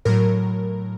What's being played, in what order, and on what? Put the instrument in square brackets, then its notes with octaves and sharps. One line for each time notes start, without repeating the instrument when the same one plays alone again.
[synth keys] A2 F#3 A#4